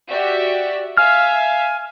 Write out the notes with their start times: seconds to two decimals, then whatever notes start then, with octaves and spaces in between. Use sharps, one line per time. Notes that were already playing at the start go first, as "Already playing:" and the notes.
0.10 F#4 G4 D5 E5
0.97 E5 F5 G#5 F6